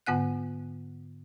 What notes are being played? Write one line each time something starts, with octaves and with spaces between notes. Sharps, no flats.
G#2 D3 B3 F#5 F#6